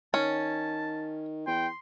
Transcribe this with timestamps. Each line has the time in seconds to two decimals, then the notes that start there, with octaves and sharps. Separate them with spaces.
0.14 D#3 C#4 A5
1.47 E2 G5 C6